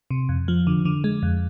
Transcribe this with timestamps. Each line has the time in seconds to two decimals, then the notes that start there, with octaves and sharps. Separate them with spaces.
0.11 C3
0.29 F2
0.48 F3
0.67 D3
0.85 D3
1.04 G#3
1.23 F2